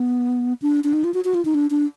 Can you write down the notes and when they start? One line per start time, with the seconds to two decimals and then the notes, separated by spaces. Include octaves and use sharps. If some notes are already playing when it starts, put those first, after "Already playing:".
Already playing: B3
0.62 D4
0.84 D4
0.93 D#4
1.04 F4
1.14 F#4
1.25 F#4
1.34 F4
1.45 D#4
1.54 D4
1.71 D4